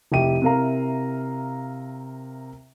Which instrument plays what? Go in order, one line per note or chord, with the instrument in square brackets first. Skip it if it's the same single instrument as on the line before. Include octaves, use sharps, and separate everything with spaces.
[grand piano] F1 E4 G4 D#7
C3 E4 A#4 F5 A#5